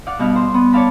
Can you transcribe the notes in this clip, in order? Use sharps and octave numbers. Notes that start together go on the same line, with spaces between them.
D5 F5 F#5
G2 B2 D4 F6
C5
B3
C#5 D5 F5 A5 B5